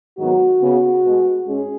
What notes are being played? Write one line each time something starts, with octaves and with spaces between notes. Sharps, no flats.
G#2 D#3 F#3 B3 F#4
C#3 B3
B2 G#3 B3
G#2 G#3 C#4 G#4